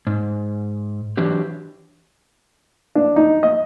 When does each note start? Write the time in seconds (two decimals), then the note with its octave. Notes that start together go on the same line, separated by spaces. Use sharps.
0.07 G#2
1.17 E3 F#3 D4 G4
2.95 D4
3.16 D#4
3.43 D#5